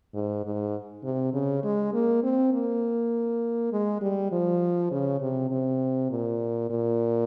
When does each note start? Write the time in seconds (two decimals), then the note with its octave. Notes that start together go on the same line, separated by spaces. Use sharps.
0.14 G#2
0.44 G#2
1.04 C3
1.33 C#3
1.64 G#3
1.94 A#3
2.23 C4
2.53 A#3
3.72 G#3
4.01 G3
4.32 F3
4.91 C#3
5.21 C3
5.51 C3
6.10 A#2
6.70 A#2